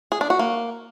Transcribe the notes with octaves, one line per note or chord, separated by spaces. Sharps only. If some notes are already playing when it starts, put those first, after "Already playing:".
G#4
D4
F#4
A#3